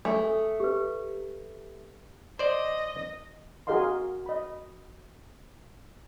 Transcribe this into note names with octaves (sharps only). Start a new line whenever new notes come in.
A3 G#5
A4
G4 B4
C5 D5 D#5
F#4 G#4 A#4 D#5 F5 C6
D#5 B5